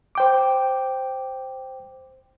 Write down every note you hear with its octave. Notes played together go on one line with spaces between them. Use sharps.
C5 G5 D6